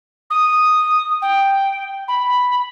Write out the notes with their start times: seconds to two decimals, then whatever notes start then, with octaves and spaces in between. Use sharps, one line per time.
0.30 D#6
1.22 G5
2.08 B5